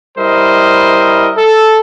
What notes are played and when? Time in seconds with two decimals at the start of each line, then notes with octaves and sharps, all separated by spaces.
0.18 G3 E4 A#4 C5 D#5
1.37 A4